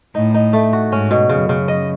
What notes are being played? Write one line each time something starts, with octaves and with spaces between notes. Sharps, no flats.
A2 D#4
D#4
A3
F#4
G#2 C#4
B2
F#2 C#3
C#3
D#5